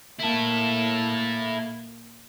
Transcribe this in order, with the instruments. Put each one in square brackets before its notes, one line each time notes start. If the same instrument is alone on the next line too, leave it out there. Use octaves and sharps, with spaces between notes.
[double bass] A#2 A#3 [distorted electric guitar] E4 A4